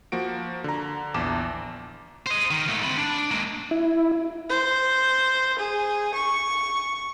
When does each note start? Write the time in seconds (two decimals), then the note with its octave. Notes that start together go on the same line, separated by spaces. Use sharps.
0.12 F3 A#3 F#4 D7
0.64 D3 A#5
1.14 A#1 E2 A5 D6 E7
2.26 C5 D#5
2.51 D#3
2.68 G#2 A3
2.84 C4 B5
2.97 D4
3.31 G#3 A#3
3.71 E4
4.50 C5
5.59 G#4
6.14 C#6